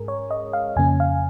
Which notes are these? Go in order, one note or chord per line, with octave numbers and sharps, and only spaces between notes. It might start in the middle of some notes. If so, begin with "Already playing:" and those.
Already playing: G#2 G#3 C#4 G#4 A#4
C#5
D#5
F5
F2 C#3 A#3 C#4 G#5
F5